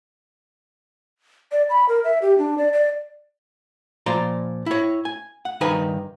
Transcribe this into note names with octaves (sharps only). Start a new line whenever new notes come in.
D5
B5
A#4
E5
G4
D4
D5
D5
A#2 F3 D5 A#5 C6
E4 C#5
G#5
F#5
G2 D#3 D#4 B4 D#5 G#5